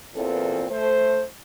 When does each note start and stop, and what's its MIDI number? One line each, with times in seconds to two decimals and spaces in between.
0.14 0.65 40
0.14 0.65 46
0.14 0.65 52
0.14 0.65 60
0.14 0.65 69
0.70 1.22 57
0.70 1.22 72